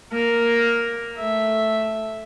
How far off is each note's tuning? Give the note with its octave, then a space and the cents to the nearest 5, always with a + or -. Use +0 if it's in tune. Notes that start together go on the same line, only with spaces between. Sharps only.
A#3 +0 A#4 +0
A3 +0 E5 +0